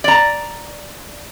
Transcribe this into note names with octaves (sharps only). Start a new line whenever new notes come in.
D5 A#5